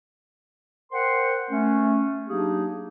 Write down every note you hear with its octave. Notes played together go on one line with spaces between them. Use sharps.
A#4 C5 F#5 G5 C6
A3 C#4
F#3 A#3 D4 D#4 G4 G#4